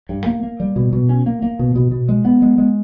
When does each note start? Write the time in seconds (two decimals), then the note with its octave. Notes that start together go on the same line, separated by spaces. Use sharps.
0.09 G2
0.26 A#3
0.43 A#3
0.60 G3
0.76 B2
0.93 B2
1.09 C#4
1.26 A#3
1.42 A#3
1.59 B2
1.75 B2
1.91 B2
2.09 G#3
2.25 B3
2.42 G#3
2.58 G#3